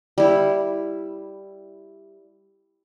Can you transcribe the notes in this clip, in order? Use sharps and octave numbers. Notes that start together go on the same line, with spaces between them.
G3 E4